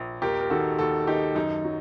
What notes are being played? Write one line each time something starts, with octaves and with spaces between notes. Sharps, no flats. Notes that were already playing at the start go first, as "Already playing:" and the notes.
Already playing: A#1
D#2 G4 A#4
A#4
D#3 F#4 A4
D#2 F#4 A4
D#3 D#4 G4
F#2 D#4
F#3